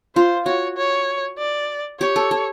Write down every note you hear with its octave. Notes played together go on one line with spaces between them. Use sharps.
F4 C5
F#4 C#5
C#5
D5
G4 C#5
A4
A4